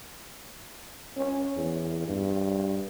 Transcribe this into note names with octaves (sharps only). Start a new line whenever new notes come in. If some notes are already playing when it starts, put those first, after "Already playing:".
C#4
E2
G2